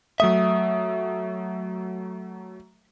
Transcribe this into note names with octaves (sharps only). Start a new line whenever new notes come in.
F#3 A3 E5 D#6